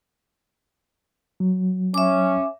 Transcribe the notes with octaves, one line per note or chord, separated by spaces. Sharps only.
F#3
C#4 E5 D6